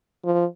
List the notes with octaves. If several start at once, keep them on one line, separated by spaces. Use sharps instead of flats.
F3